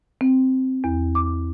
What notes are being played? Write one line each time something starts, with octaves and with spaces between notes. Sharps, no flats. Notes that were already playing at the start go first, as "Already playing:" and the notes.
C4
E2
D6